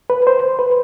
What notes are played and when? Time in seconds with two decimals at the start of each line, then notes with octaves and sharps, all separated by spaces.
0.10 B4
0.27 C5
0.59 B4